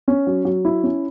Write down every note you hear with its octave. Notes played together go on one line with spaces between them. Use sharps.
C#4
F#3
F#3
E4
C#4